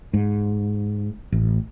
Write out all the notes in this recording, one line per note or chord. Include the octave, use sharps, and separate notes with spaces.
G#2
A1